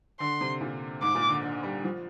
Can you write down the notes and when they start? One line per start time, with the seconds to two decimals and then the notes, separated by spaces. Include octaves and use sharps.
0.20 D3 C6
0.41 C3
0.61 A#2
1.02 G#2 D6
1.15 A#2
1.29 D3
1.43 D3
1.63 G3
1.84 F3